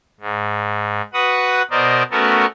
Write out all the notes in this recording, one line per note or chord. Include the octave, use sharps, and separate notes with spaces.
G#2
F#4 B4 F#5 D#6
B2 A#4 C5 D5 D#5
A3 B3 C#4 F#4 A4 A#4